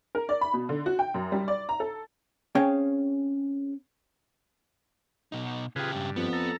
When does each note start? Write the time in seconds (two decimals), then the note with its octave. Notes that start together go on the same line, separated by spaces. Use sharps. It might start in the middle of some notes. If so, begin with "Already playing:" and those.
0.15 A#4
0.29 D5
0.41 B5
0.54 B2
0.69 D3
0.86 F#4
0.99 G5
1.14 F#2
1.32 G3
1.48 D5
1.69 A#5
1.80 A4
2.55 C4 C#4 G#4 C#5 F5 G5
5.32 B2 D#4
5.76 C#3 F4 G4 G#4 B4
5.95 G2
6.16 F2 B3
6.33 A4 A#5